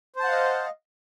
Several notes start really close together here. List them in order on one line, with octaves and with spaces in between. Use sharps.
C5 A5 F#5 F5 D#5